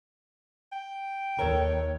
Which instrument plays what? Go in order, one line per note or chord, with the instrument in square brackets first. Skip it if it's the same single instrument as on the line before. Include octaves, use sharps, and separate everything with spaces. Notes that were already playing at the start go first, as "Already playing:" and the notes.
[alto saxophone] G5
[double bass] D#2 [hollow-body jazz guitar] A4 A#4 [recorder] C#5